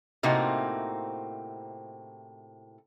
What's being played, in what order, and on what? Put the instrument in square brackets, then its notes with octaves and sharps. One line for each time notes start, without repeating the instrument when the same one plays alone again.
[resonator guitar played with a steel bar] A2 C3 A#3 C4 D#4 F#4